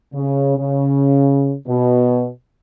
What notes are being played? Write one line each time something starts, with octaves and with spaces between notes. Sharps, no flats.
C#3
C#3
B2